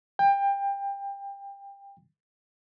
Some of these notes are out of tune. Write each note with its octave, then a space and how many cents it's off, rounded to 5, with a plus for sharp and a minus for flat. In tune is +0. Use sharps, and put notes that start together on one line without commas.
G5 +25